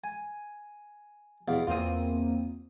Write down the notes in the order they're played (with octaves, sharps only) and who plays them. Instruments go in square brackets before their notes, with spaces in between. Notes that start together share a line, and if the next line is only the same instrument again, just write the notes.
[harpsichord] G#5
E2 B2 F5
[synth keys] E2 A#3 C4 [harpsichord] F4 D#6